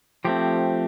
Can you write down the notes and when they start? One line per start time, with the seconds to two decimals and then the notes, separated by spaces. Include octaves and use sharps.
0.25 F3 A3 C4 G4